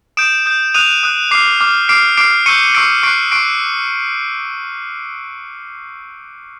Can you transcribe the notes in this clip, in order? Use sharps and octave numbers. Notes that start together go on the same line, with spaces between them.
D#6 G6 D7 E7
D#6 G6
D#6 F#6 D#7 F7
D#6 F#6
D6 F6 C7
D6 F6
D6 F6 C7 D7
D6 F6 C7 D7
C#6 E6 G6 C#7 D#7
C#6 E6 G6 C7 D7
C#6 F#6 C7 D7
C#6 F#6 C7 D7